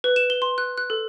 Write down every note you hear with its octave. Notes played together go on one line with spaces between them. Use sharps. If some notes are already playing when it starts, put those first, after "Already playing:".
B4
E7
G7
C6
F#6
F#6
A4